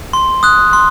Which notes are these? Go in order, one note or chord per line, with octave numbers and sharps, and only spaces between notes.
C6
D#6 F#6
C6